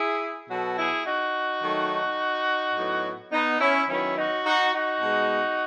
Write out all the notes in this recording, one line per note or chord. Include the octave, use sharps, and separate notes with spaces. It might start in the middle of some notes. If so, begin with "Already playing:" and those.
Already playing: E4 G#4
B2 F#3 B3 F#4 A4
E4 G#4
D#4 F#4
D#3 F#3 A3
A2 F#3 B3
B3 D#4
C#4 E4
D#3 F#3 B3 C#4 E4
D#4 F#4
D#4 F#4
D#4 F#4
B2 G#3 B3